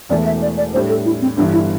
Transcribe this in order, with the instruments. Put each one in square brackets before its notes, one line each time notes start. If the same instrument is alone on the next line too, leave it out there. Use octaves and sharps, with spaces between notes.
[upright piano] E1 E2 E3 A3 [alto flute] D5
[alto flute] E5
D5
D5
[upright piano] A2 G3 D4 [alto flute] C5
[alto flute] A4
E4
C4
[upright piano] G1 G2 E3 [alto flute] D4
[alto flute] E4